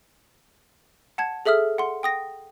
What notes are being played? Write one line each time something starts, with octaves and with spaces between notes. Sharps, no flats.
F#5 A5 G#6
G#4 A4 E5 D#6 F6
F#5 C6
G5 D#6 A#6